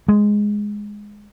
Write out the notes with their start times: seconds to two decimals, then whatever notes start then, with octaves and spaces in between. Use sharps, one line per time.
0.08 G#3